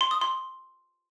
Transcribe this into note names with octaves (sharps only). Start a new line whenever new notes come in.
C6
D#6
C6